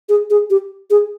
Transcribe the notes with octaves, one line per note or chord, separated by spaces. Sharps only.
G#4
G#4
G4
G#4